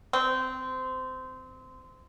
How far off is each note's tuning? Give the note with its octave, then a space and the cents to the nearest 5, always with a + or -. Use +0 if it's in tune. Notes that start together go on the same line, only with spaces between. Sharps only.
C4 -20